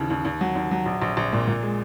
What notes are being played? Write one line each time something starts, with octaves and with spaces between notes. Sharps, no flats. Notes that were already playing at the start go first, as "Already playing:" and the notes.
Already playing: D#2 C#3 E3
D#2
D#2
F#3
D#2
F#3
A#1
A#1
A#1
A#2
A#2
G#3